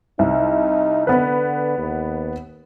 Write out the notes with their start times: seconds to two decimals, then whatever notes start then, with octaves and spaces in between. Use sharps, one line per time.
0.19 C2 D#4
1.07 D3 B3 B4
1.78 D#2